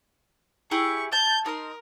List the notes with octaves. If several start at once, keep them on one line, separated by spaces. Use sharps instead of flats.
E4 G4 G#4 C#6
A5 G6
D#4 A#4 C6